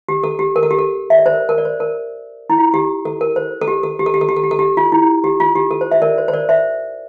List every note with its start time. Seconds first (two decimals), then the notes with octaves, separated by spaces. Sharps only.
0.09 G4
0.24 A4
0.39 G4
0.56 A#4
0.63 A4
0.71 G4
0.79 A4
1.10 E5
1.18 D5
1.26 C5
1.33 A#4
1.49 A#4
1.58 D5
1.65 C5
1.80 A#4
2.50 E4
2.58 F4
2.74 G4
3.05 A4
3.21 A#4
3.36 C5
3.61 A4
3.68 G4
3.83 A4
3.99 G4
4.06 A4
4.14 G4
4.21 A4
4.29 G4
4.36 A4
4.44 G4
4.51 A4
4.59 G4
4.77 F4
4.92 E4
5.24 G4
5.40 F4
5.56 G4
5.71 A4
5.81 C5
5.91 C5 E5
6.02 A#4 D5
6.18 C5
6.28 C5
6.33 A#4 D5
6.49 C5 E5